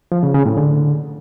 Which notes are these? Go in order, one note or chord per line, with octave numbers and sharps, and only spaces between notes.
F3
C#3
C#3
A2
D3